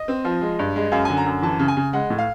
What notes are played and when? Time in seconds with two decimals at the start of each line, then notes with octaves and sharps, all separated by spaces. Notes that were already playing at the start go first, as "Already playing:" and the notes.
Already playing: D#5
0.08 C4
0.25 F3
0.42 G#3
0.59 G2
0.76 G#3
0.92 F#2 F5
1.05 G#5
1.10 D3
1.17 A#5
1.26 F#2
1.42 E3 A5
1.59 C#3
1.68 G#5
1.77 C#3
1.93 G#3 F#5
2.10 A2
2.18 F5